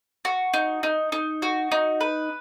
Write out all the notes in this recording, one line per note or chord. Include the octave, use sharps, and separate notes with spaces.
F#4
D#4
D#4
D#4
F#4
D#4
B4